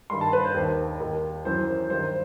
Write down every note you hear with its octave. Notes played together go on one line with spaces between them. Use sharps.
G2 D#3 C6
A5
B4
C5
D#2 D#3
D#2 D#3
F#2 E3 C5
G2 D#3 C5